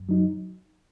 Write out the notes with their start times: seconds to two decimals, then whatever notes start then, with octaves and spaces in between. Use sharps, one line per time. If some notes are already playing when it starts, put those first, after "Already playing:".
Already playing: F#2
0.09 F#3 D#4